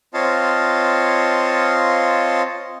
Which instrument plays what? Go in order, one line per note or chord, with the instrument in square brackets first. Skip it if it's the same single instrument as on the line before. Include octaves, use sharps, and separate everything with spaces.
[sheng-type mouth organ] C4 F4 C#5 D#5 F5 A5